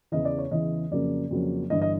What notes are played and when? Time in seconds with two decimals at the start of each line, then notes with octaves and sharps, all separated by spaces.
0.12 E2 C#3 E3 D#5
0.25 D5
0.38 C#5
0.51 E2 C#3 E3 D#5
0.91 F2 C#3 F#3 A#3 C#4 D5
1.31 F2 C#3 F#3 A#3 C#4
1.70 G1 G2 E3 D#5
1.82 D#5